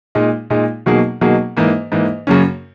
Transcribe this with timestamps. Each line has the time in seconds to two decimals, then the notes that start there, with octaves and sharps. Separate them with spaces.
0.15 A#2 G#3 D#4
0.50 A#2 G#3 D#4
0.86 B2 F#3 A#3 D#4 G#4
1.21 B2 F#3 A#3 D#4 G#4
1.57 G#2 E3 A#3
1.92 G#2 E3 A#3
2.27 F#2 C#3 F#3 A#3 C#4